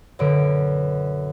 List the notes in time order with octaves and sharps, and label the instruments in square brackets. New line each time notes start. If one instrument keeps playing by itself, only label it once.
[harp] F#2 B2 D3 D7